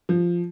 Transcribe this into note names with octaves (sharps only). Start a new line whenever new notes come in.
F3